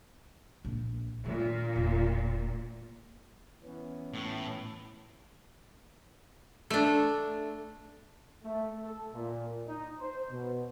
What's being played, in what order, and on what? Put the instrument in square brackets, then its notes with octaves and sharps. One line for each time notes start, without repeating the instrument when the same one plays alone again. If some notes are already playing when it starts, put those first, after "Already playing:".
[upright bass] A#1
[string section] A#2 [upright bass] D#3 D4
[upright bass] E1
[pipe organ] E3 B3 C#4
[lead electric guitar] A2
[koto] A3 D4
[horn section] A3
A4
A#2
D#4
C5
B2